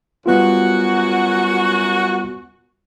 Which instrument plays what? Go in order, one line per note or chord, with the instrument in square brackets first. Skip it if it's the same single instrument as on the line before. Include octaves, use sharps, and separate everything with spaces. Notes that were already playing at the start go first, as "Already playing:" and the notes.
[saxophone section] F#2 F#4 [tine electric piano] G3 B3 F4